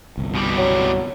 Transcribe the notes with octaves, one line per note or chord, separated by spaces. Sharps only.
G1 C2
B2 G3
F#3